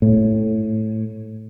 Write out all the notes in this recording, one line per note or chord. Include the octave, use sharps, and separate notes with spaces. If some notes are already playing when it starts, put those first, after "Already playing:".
A2